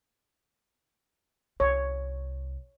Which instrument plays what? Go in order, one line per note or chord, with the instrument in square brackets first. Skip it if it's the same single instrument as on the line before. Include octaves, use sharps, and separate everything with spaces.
[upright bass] C2 [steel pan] C#5